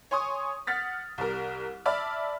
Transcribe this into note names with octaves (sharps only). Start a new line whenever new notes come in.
C#5 G#5 C6 C#6 D#6
F#5 F6 A6 B6
C2 G3 A#4
D5 E5 A5 B5 F6